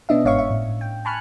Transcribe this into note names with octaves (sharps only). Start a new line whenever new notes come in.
B2 B3 C#4 D4 D#5 E5
G1 G#2 C#5 E5 F5 C#6
E5
A2
G5
G#5 A5 B5 C#6 F6 F#6